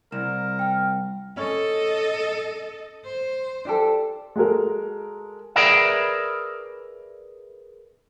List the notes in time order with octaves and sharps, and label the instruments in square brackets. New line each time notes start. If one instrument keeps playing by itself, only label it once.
[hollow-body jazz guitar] C2 [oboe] A#4 [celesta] E7
[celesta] G5 F6
[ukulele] C#4 [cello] A4 D#5
[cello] C5
[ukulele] D4 G4 A4
[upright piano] G#3 F#4 A4 A#4
[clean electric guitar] G#4 A#4 B4 D5 E5